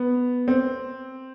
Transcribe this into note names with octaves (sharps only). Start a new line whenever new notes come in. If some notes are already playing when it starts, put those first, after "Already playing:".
Already playing: B3
C4